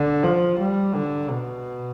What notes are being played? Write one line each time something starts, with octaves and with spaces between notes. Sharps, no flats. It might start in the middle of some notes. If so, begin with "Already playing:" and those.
Already playing: D3
F3
G3
D3
B2